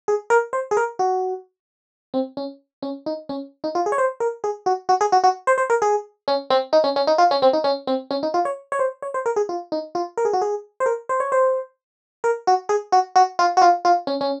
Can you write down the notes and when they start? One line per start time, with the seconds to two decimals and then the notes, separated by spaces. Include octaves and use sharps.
0.08 G#4
0.30 A#4
0.53 C5
0.71 G#4
0.77 A#4
0.99 F#4
2.14 C4
2.37 C#4
2.82 C#4
3.06 D#4
3.29 C#4
3.64 D#4
3.75 F4
3.86 G#4
3.92 C#5
3.98 C5
4.20 A#4
4.44 G#4
4.66 F#4
4.89 F#4
5.01 G#4
5.12 F#4
5.24 F#4
5.47 C5
5.58 C5
5.70 A#4
5.82 G#4
6.28 C#4
6.50 C4
6.73 D#4
6.84 C#4
6.96 C#4
7.07 D#4
7.18 F4
7.31 C#4
7.42 C4
7.53 D#4
7.64 C#4
7.87 C4
8.11 C#4
8.23 D#4
8.34 F4
8.45 C#5
8.72 C#5
8.79 C5
9.02 C#5
9.14 C5
9.26 A#4
9.36 G#4
9.49 F4
9.72 D#4
9.95 F4
10.17 A#4
10.25 G#4
10.33 F#4
10.42 G#4
10.80 C5
10.86 A#4
11.09 C5
11.20 C#5
11.32 C5
12.24 A#4
12.47 F#4
12.69 G#4
12.92 F#4
13.16 F#4
13.39 F4
13.57 F#4
13.62 F4
13.85 F4
14.07 C#4
14.21 C#4